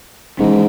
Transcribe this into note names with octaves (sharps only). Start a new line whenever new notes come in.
G#2 E3 G#3 C#4